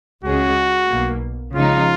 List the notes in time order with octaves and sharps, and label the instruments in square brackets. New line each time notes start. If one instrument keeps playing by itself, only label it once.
[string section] C#2 C#3 G#3 C#4 G#4 [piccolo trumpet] F#4
[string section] B1 B2 A#3
[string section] C#3 F3 G#3 D#4 [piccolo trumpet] F4